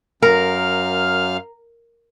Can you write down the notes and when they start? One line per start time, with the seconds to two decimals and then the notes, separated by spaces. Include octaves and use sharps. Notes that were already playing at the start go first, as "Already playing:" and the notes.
0.22 F#2 A#4 F5 F6